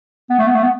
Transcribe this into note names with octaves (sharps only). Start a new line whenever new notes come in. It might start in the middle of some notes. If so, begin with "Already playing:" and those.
B3
A3
B3
A3
B3